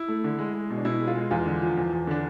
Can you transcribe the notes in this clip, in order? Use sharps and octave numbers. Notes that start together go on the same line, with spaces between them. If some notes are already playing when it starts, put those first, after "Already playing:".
Already playing: E4
A3
D3
G#3
G#3
B2
D4
B2 E4
G#3
F4
G#3
E2 F4
D3
F3
E2
E2
D3 D4